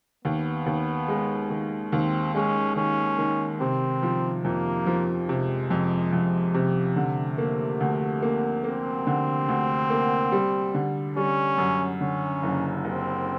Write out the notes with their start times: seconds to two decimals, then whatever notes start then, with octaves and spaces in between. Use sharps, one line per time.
0.25 D#2 B3
0.66 D#2
1.08 G#3
1.50 D#3
1.92 D#2 C4
2.34 G#3 C#4
2.76 D#3 C#4
3.18 D#3
3.60 C3 C4
4.03 F3
4.44 F2 A#3
4.87 F3
5.29 C3 G#3
5.70 F2
6.12 F2
6.54 C3
6.96 D3 A3
7.38 A#3
7.80 D2
8.22 A#3
8.64 A#3 C4
9.07 D3
9.48 D2
9.90 A#3
10.32 G3
10.74 D3
11.16 G3 C#4
11.58 F#2
12.01 D3 C#4
12.43 F#1
12.84 F#1 C4